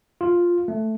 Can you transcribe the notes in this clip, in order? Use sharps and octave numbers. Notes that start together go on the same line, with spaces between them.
F4
A3